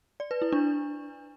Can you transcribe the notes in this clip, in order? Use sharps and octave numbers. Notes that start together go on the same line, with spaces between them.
D5
B4
E4
D4